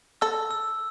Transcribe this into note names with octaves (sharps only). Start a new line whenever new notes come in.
A4 E6
E6